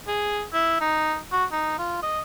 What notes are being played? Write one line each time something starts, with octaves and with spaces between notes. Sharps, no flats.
G#4
E4
D#4
F#4
D#4
F4
D#5